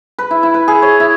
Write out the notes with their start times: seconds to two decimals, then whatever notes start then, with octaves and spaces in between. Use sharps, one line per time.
0.19 B4
0.31 E4
0.43 E4
0.54 B4
0.68 G#4
0.82 C#5
1.00 E4